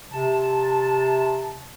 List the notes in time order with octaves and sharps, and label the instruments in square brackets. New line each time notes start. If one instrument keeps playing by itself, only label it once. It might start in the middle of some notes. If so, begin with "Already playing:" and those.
[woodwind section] C3 A5